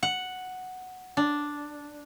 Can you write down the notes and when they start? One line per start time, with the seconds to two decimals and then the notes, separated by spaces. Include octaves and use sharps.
0.03 F#5
1.17 D4